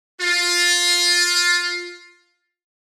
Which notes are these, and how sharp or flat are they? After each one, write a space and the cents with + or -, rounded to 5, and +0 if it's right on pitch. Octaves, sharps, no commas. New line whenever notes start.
F4 +10